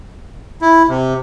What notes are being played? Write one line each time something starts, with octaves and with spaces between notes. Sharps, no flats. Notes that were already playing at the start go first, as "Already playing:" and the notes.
E4
C3